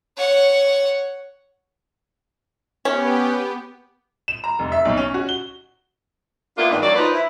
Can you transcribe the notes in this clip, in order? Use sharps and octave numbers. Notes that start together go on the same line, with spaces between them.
C#5 F#5
B3 C#4 G4
E7
A#5
F1
E5
B1
C#4
F#4
G7
A#3 B3 D4 E4 F4
G2 D#3 G3 G#3 D4
F#3 A#3 D5
F3 D#4 B4
E4